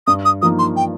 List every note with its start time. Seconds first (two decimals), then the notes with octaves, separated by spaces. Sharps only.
0.07 G2 D#6
0.25 D#6
0.42 F3 A#3 D#4 D#6
0.59 C6
0.77 G5